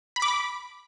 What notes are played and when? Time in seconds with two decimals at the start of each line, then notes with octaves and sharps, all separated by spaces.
0.16 B5
0.22 D6
0.28 B5